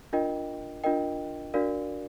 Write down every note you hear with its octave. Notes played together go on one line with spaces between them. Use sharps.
D4 F4 A#4 D#5 G5
D4 F4 A#4 D#5 G5
D4 F#4 A#4 D5 F5